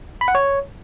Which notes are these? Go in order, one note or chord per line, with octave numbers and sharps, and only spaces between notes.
B5
F#5
C#5